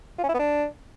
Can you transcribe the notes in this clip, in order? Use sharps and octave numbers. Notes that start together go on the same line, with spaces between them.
F4
C#4
E4
B3
D4